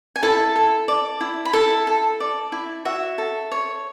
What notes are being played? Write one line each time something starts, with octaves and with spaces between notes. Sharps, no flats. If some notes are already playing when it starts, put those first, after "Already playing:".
G#5
E4 A4 A5
A4
D5
E4
B5
E4 A4 A5
A4
D5
E4
F#4 E5
A4
C#5